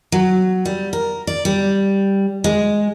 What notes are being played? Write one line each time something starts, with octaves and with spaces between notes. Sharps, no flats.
F#3
G3
A#4
D5
G3
G#3